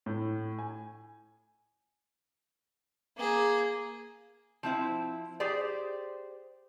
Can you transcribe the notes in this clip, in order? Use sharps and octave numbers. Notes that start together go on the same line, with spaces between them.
A2
G#5
A#3 G#4
F3 C4 E4 C5
G4 G#4 C5 D5